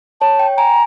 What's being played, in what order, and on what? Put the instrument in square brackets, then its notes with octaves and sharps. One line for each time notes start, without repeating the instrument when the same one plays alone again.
[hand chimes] C#5 [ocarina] A5
[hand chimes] G5
[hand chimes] G#5 [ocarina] A#5